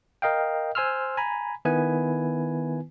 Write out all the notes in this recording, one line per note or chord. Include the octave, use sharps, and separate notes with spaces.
A#4 D#5 F5 G5
C5 G#5 C6 E6 F6
G#5 A#5 B5
D#3 B3 E4 B4 G#5